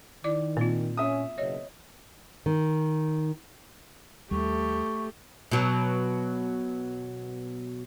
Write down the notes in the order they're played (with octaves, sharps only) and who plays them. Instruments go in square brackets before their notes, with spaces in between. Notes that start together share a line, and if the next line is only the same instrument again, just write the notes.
[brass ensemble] D#3 [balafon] E4 D5 D6
[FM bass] A#2 [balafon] A#3 C4 F4
[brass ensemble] C#4 [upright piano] E5 D#6
[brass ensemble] F#1 B2 [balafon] C#5 D#5
[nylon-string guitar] D#3
[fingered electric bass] D#2 G3 [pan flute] A3 [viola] G4 A4 [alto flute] C#6
[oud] B2 F#3